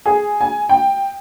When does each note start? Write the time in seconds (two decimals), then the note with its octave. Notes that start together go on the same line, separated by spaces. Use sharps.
0.06 G#4
0.41 G#5
0.69 G5